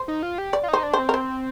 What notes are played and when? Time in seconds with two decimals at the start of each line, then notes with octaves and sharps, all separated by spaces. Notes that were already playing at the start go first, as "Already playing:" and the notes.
Already playing: C5
0.08 D#4
0.23 F4
0.38 G4
0.53 D5
0.63 F4
0.68 D#4
0.73 C5
0.83 D4
0.93 C4 C5
1.09 A#4
1.14 C5